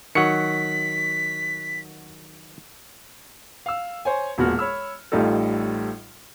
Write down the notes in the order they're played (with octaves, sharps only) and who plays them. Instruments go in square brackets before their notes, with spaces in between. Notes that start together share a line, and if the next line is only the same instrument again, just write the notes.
[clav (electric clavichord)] D#3 F#3 [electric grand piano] F#5 C#6 C#7 [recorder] B6
[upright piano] F5 E6
C5 C#5 G#5
E1 A#2 B3 F#4 F6
C#5 B5 E6 F6
A1 A2 G3 D#4 F4 A4